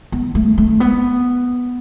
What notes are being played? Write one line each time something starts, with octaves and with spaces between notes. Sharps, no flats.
B3
A3
A3
B3